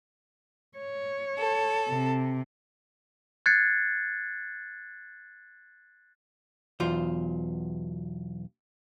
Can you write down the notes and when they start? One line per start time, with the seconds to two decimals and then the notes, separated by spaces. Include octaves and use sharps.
0.78 C#5
1.38 A4
1.88 C3
3.46 F#6 G#6 A6 C7 C#7
6.80 B1 E2 F4 C5